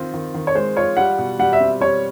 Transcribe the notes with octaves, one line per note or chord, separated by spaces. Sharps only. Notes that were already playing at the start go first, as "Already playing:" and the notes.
Already playing: D#3 C4 F4
D#3
D#3
C#5
G#3 C5
F4 C#5
G3 F#5
B2
G3 F#5
E5
C4
G3 C#5